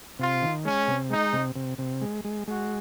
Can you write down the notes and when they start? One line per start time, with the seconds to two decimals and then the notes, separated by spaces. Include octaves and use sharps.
0.19 C3 F4
0.42 D#3
0.64 G#3 C#4
0.88 C3
1.10 G#3 D#4
1.33 C3
1.56 C3
1.78 C3
2.01 G#3
2.25 G#3
2.47 G#3 F#4